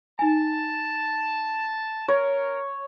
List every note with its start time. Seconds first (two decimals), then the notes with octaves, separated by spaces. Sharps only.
0.19 D#4 G#5 A5
2.08 C#4 A#4 C#5